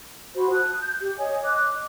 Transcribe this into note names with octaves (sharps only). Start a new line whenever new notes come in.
F#4 C5 B5
A5 D#6 F#6
G6
G4
C#5 D#5 G#5 D#6
D#5 D6 F#6